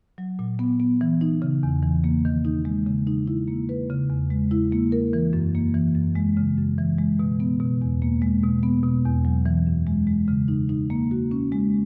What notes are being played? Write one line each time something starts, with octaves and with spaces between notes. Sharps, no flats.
F#3
A#2
B3
B3
E3
D#4
C#3
E2
E3
A#3
D#3
D#4
G#3
C#3
D#4
E4
A#3
B4
C#3
E2
G#3
E4
A#3
A#4
E3
F#2
A#3
E3
F#2
G#3
C#3
F#2
E3
G#3
B2
B3
B2
E2
A#3
G#3
B2
B3
B2
E2
F#3
E3
F#2
G#3
G#3
C#3
D#4
D#4
A#3
F#4
C#4
G#3